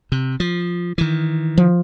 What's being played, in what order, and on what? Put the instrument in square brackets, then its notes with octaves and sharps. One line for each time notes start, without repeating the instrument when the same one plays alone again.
[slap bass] C3
F3
D#3 E3
[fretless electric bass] F3